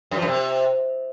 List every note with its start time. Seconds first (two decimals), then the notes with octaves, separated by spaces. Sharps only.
0.11 F#2
0.17 F3
0.22 F#2
0.27 C3